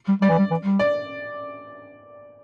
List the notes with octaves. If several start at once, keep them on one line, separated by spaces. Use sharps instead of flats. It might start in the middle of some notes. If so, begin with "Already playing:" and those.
G3
G3 D5
E3
G3
E3
G3
D5